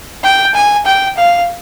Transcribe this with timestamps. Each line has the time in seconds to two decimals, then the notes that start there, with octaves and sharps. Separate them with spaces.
0.24 G5
0.55 G#5
0.86 G5
1.18 F5